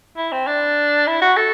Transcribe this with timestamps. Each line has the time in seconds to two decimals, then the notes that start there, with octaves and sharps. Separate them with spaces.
0.17 E4
0.32 C4
0.47 D4
1.07 E4
1.22 F#4
1.37 A4